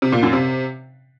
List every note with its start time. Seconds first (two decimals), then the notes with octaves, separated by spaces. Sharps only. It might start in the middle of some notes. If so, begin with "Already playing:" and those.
0.02 C3
0.12 A#2
0.23 F#2
0.33 C3